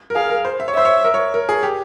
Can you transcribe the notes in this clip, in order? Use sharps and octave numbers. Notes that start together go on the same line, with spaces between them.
A#4
G#4 F5
A#4
C5
E5
C#5
C5 E5
C#5
A#4
C#5
A#4
G#4
G4